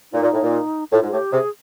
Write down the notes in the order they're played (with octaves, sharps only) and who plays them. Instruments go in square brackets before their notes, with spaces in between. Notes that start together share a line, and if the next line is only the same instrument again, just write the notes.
[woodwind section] A#2 [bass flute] D#4
[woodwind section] A#2
A2
A#2
[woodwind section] A2 [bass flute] F4
[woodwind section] G#2
[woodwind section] A2 [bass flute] G4
[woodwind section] C3 [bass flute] G#4